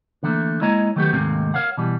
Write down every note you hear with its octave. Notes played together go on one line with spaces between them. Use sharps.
D3 E3 A3 A#3
G#3 A#3 E4 C#5 D#5 A#5
D#3 F#3 A3 B3 F#4 G4
D#2 G#2 C3 A3 A#3 C4
A#4 C#5 F5 F#5
B2 E3 G3